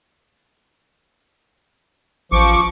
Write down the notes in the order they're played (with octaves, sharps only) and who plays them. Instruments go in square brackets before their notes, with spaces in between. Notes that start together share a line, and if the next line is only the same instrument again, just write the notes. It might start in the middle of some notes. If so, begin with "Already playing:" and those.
[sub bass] A1 [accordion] F3 C#6 D6